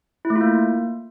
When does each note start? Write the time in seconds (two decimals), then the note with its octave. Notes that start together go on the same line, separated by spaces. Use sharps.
0.25 E4
0.30 A3
0.36 F4
0.41 A#3